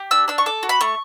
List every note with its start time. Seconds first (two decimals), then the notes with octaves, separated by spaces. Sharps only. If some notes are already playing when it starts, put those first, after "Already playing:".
Already playing: G4
0.11 D4 E6
0.28 D4 E6
0.38 C#6
0.46 A4 D6
0.63 F#4
0.69 B5
0.81 A3 C#6